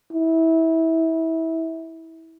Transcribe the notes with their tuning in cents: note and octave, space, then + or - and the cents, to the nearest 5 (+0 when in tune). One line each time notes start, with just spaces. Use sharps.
E4 -25